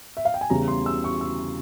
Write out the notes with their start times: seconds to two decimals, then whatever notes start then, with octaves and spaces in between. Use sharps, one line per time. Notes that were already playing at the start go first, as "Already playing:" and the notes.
0.17 E5
0.25 F5
0.34 G5
0.41 G#5
0.50 E2 C#3 G3 A#5
0.68 C6
0.86 E6
1.04 C#6
1.21 E6